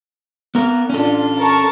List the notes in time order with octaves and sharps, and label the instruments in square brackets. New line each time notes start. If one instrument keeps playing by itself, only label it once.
[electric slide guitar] B3 A#4
[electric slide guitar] C#4 A4 [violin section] D4 F4
[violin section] A#4 A5 C#6